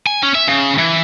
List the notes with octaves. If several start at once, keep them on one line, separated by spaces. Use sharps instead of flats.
G#5
C#4
E5
C#3
E3